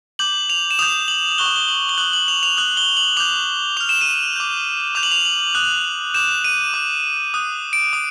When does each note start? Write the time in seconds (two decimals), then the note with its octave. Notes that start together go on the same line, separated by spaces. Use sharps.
0.19 D6 G6 F#7
0.50 F7
0.71 E7
0.79 D#6 G6 F7
1.08 F#7
1.38 C#6 F#6 G7
1.56 G7
1.68 F#7
1.89 G7
1.98 D#6 F#6 F#7
2.13 F#7
2.28 F7
2.43 F7
2.57 D#6 F#6 F#7
2.77 G7
2.97 F#7
3.17 D6 G6 F7
3.77 D6 F6 F7
3.89 E7
4.01 D#7
4.14 E7
4.36 D6 G6
4.95 D6 G6 F7
5.03 F#7
5.12 F7
5.25 F#7
5.55 D#6 F#6
6.14 D6 G6 E7
6.44 D#7
6.74 D6 F#6
7.34 D#6 F#6
7.73 D7
7.93 D#6